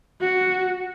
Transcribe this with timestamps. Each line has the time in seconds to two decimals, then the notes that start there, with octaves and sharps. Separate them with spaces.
0.21 F#4